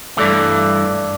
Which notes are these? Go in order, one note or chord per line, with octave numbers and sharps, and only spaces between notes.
G2 E3 A3 D5